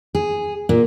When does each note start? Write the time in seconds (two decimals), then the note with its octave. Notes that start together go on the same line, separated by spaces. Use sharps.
0.15 G#4
0.69 A#2